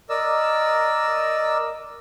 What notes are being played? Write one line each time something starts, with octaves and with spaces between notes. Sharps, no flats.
A#4 D5 D#5 E6